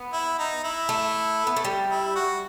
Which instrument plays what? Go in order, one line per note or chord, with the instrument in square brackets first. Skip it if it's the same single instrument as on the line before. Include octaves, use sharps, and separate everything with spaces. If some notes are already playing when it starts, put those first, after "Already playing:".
Already playing: [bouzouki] B3
[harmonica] E4
D#4
E4
[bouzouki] A3
B3
A3
G3
[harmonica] E4
F#4